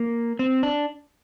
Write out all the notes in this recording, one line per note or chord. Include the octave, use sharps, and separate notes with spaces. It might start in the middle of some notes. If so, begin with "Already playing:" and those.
Already playing: A#3
C4
D4